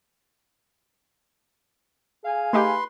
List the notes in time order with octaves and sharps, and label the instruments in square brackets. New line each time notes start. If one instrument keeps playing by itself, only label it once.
[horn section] G#4 F5 G#5
[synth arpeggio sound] A3 D#4 G4 [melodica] B4 C6